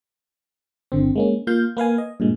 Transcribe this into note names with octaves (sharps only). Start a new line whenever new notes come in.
G1 D3 C4
G#3 A#3 C#4
A#3 F4 F5 G6
A#3 B4 F5 G#5
D#5
G2 A#2 G#3